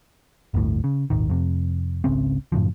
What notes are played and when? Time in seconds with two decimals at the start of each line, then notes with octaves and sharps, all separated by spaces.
0.54 G1 D2 A2
0.84 C#3
1.10 D#1 G#1 D#3
1.29 F2 C3
2.04 G#1 C#2 C#3 C4
2.52 F#2 A2 C#3 F3